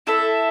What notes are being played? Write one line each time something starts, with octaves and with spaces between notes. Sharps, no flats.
E4 A4 E5